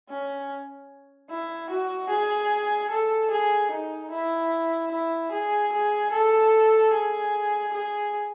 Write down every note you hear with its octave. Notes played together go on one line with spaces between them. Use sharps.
C#4
E4
F#4
G#4
A4
G#4
D#4
E4
E4
G#4
G#4
A4
G#4
G#4